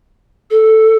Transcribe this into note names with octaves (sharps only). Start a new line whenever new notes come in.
A4